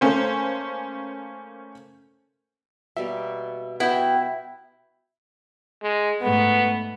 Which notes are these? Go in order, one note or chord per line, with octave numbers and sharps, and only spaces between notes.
A3 A#3 C#4 C5
B2 G3 A#3 E5
B3 E4 F#4 G5
G#3
G#2 A3 B3